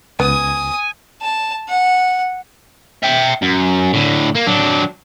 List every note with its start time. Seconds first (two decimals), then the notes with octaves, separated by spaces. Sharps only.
0.20 C#2 B3 G#5 D#6
1.22 A5
1.69 F#5
3.03 E5 G5
3.42 F#2
3.94 A2 D3
4.35 A#3
4.47 F#3 D4